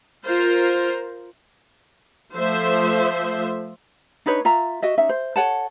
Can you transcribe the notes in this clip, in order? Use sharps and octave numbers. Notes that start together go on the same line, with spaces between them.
F4 A#4 C5
F3 A3 C5 E5
D4 D#4 B4 C#5
F4 E5 A#5
F#4 D#5 E5
C#4 D#4 E5
C5
A4 C#5 F#5 A5